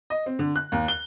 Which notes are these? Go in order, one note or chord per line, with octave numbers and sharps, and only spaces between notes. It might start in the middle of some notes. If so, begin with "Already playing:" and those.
D#5
C4
D3
F#6
D#2
G7